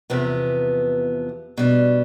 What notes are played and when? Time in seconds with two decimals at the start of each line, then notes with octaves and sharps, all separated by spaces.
0.10 E2 C3 F3 B3
1.58 B2 G3 D4